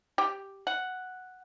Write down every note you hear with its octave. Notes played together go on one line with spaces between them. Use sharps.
G4
F#5